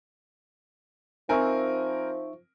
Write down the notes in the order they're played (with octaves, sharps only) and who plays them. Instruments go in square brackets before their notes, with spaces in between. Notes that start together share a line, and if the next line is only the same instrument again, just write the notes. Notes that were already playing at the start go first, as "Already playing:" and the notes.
[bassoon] F3 [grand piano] C4 A#4 G#5 [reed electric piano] D#4 E5 C#6